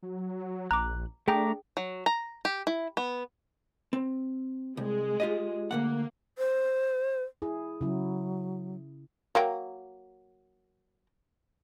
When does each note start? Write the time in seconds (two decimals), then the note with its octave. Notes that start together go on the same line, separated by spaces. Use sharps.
0.03 F#3
0.71 A#1 A#5 D6 F#6
1.28 A3 D4 G#4 G5 A#5 D6
1.77 F#3
2.06 A#5
2.45 G4
2.67 E4
2.97 B3
3.93 C4
4.77 C2 G#3
5.20 F4 G4 D#5
5.71 D2 F3 A#3 F#5
6.38 C5
7.42 E4 G#4
7.81 C#3 F#3 E4
9.35 F#3 A#3 G5